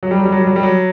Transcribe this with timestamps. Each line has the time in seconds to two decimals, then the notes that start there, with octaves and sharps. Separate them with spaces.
0.03 F#3
0.11 G3
0.19 F#3
0.25 G3
0.32 F#3
0.41 G3
0.47 F#3
0.56 G3
0.63 F#3